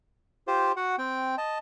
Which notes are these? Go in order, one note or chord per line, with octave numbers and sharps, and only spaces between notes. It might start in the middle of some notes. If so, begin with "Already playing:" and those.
F4 G4 C5
F#4 F#5
C4 G5
D#5 A5